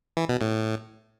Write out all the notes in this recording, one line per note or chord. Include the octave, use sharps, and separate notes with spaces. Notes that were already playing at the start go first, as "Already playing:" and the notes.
E3
B2
A2